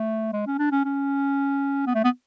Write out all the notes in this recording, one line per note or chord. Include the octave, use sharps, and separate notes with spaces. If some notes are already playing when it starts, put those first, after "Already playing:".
Already playing: A3
G#3
C#4
D4
C#4
C#4
B3
A3
B3